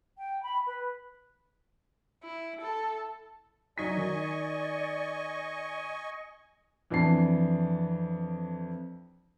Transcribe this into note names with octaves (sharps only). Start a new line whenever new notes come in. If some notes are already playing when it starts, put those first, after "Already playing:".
G5
B5
B4
E4
A4
F#3 D#4 D5 D#5 G#5 C#6 B6
D#3
F2 E3 D4 A5 C7